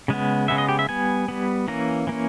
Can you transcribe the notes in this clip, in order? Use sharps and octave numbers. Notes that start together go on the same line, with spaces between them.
C#3 G#3 B3
C#3 G#3 B3 E5
D#5
G4
E5
G3 B3 G#5
G3 B3
E3 A#3 C#4 A#5
E3 A#3 C#4